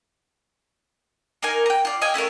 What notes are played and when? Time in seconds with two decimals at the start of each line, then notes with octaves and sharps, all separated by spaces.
1.42 A#3 D#4 A#4 G#5
1.66 G5 A#5
1.85 F4 D5
2.01 D#5 F5 G5 G#5
2.14 A3 C#4 F4 A#4